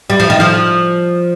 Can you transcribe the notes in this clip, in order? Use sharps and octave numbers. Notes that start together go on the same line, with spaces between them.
G3
F3
D#3
F3